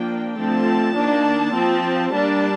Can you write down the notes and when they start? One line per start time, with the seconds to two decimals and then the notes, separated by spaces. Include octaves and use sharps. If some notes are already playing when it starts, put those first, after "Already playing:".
Already playing: F3 A#3 D4 G5
0.38 D3 F3 A3 C4 A5
0.96 D#3 A#3 D4
1.54 F3 C4
2.12 G3 A#3 D4 A5